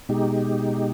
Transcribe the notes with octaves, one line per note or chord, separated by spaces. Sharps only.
B2 G#3 D#4 G4